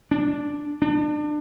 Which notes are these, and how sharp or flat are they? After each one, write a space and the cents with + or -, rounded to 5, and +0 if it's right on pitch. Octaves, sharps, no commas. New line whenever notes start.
D4 -5
D4 +30